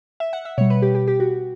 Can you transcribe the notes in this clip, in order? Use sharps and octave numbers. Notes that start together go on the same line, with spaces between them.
E5
F#5
E5
B2 G3 C#5
B4
G4
G4
G4
F#4